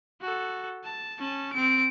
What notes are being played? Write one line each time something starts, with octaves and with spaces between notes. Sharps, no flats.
F#4 A4
A5
C#4 A5
C4 D7